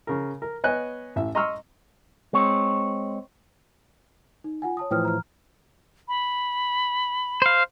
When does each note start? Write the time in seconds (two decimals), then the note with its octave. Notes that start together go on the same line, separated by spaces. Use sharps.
0.07 C#3 A#4
0.42 A#4
0.64 B3 C#5 D#5 G#5 F#6
1.16 A1 E5
1.35 D#5 A#5 C6 C#6 E6 F6
2.33 G#3 C4 C#5
4.44 D#4
4.62 F4 F#5 G#5
4.77 C#5 A5 D#6
4.91 A2 E3 F3 G5 D#6 F6
5.05 A#5 F6
6.08 B5
7.42 C5 F5